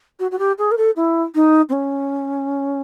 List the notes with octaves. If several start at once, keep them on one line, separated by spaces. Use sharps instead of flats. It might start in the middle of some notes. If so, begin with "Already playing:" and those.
F#4
F#4
G4
G#4
A#4
A4
E4
D#4
C4
C#4